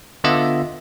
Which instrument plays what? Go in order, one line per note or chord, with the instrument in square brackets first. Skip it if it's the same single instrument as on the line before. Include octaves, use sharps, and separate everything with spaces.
[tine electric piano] D3 B3 F4 D#5 E5